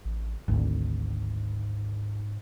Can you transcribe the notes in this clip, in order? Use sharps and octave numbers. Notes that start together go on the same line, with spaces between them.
A1
G#1 D2 G#2